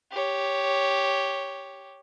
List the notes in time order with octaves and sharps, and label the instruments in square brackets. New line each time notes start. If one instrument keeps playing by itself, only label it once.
[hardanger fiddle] G4 C#5